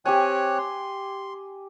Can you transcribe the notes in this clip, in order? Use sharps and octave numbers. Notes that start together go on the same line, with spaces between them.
C4 G4 C#5 G#5 F#6
C6